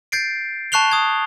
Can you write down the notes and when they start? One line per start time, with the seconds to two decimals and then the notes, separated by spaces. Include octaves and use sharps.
0.12 G6 A6 C7 D7
0.72 A5 C#6 F#6 C7 F7 G7
0.92 D#6 G#6